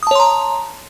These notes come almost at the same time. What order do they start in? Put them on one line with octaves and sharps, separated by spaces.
D#6 A5 C#5 C6 A#5